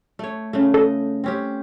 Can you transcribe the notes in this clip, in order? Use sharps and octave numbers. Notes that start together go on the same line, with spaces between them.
A3 C#5
C#3 A3
A4 D#5
C4 C#4 G4